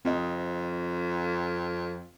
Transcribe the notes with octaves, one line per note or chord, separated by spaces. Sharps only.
F2 C4 D#5